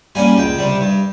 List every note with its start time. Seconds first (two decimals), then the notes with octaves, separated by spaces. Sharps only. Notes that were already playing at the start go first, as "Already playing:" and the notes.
0.15 G3 A#3 C#4 G#5
0.37 C#2 G5
0.58 C3 G3
0.81 G2